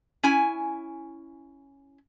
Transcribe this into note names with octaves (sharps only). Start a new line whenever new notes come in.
C#4 E4 G#5